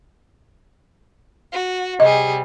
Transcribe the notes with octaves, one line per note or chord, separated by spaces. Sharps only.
F#4
C3 G3 G#4 D#5